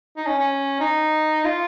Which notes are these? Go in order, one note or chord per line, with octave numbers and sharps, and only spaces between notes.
D#4
C#4
C#4
D#4
F4